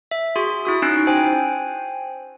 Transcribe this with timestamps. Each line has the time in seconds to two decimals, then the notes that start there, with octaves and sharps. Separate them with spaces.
0.11 E5
0.36 F#4 G#4 C6
0.65 E4 F#4 D#6
0.82 C#4 D#4 F#6 C7 D7
1.07 C5 G5 G#5